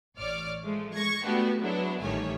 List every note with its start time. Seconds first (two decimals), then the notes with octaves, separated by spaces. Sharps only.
0.18 A1 C#5 D5 D6 F6
0.64 F3 G#3 A3
0.95 G#3 C#6 G#6 A#6
1.25 A3 B3 D4 F#4 G4
1.60 F#3 G#3 B3 D4 E4
2.03 A1 D#3 G3 A3 C#5 G#5